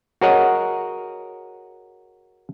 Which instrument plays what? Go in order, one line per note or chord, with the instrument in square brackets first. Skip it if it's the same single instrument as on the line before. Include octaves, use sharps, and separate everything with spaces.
[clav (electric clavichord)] F#4 G#4 A#4 C#5 D#5 F#5